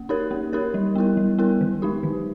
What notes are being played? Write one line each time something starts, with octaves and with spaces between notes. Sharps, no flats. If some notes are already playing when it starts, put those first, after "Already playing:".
Already playing: A#3
D#4 G4 A#4 C#5
A#3
D#4 G4 A#4 C#5
G3
B3 E4 A#4
G3
B3 E4 A#4
D#3
G#3 D#4 G4
D#3